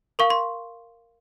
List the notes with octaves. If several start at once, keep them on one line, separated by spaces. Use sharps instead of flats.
A#4 F5 C#6
C6